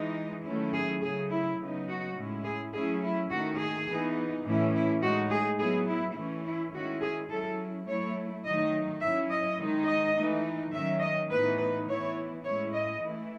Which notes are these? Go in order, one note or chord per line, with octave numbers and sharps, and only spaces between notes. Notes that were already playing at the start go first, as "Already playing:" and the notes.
Already playing: E3 G#3 D#4
D#3 F#3 A3 C#4 E4
G#4
C#3 F#3 A3 G#4
E4
C#3 F#3 B3 D#4
F#4
A2 G#3 C#4 E4
G#4
F#3 A3 C#4 E4 G#4
E4
D#3 A3 D#4 F#4
G#4
E3 B3 D#4
A2 E3 A3 C#4 E4
E4
A2 G#3 D#4 F#4
G#4
F#3 B3 E4 G#4
E4
E3 A3 C#4 E4
E4
D#3 G#3 C#4 E4 F#4
G#4
F#3 C#4 E4 A4
F#3 A3 E4 C#5
D#3 F#3 A3 D#4 D#5
F#3 C#4 E4 E5
D#5
D#3 G#3 D#4
D#5
E3 A3 D#4
D#3 F#3 C#4 E5
D#5
A2 E3 B3 D#4 B4
B4
E3 B3 E4 C#5
A2 G#3 C#4 E4 C#5
D#5
E3 A3 E4